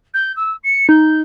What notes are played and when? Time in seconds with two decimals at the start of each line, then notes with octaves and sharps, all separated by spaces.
0.14 G6
0.36 E6
0.63 C#7
0.89 D#4 G6